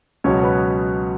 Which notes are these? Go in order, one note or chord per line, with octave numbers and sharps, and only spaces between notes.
C#2 B2 F#3 C#4 C#5
B3 B4